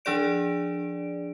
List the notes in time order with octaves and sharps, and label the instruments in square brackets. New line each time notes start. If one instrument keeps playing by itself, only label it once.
[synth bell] F3 D4 G#4 D5 D7